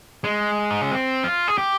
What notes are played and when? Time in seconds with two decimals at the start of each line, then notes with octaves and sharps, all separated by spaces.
0.24 G#3
0.71 D#4
0.81 C#4
0.91 C4
1.24 F4
1.48 G#4
1.58 G4